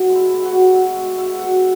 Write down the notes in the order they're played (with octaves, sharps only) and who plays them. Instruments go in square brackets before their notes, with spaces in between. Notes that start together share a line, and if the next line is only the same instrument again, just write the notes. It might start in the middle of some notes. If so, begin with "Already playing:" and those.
Already playing: [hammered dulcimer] B2 B3 E5
G#3
E4
B3
F#4
B2
B2 E5
G#3 F#5
B3 E5
B2 F#5